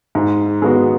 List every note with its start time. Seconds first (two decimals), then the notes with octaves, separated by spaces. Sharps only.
0.15 G#2
0.62 G#3 B3 F#4